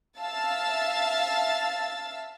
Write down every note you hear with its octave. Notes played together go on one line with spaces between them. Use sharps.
E5 F5 A5 E6 A6